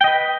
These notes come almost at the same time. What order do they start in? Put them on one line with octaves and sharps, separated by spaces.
G5 D#5 B4